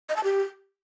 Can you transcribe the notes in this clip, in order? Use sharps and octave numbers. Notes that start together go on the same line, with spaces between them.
D#5
A5
G4